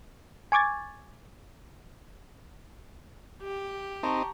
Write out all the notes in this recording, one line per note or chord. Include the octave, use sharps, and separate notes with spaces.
G#5 C#6 D6 G#6 A6
G4
C4 D#4 A5 A#5 C#6